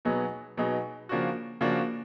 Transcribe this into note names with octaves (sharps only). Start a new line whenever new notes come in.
B2 F#3 B3 D#4 G#4
B2 F#3 B3 D#4 G#4
C#3 F3 A#3 D4 F#4
C#3 F3 A#3 D4 F#4